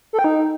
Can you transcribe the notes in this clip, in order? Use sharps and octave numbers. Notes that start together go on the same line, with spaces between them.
A4
G5
D#4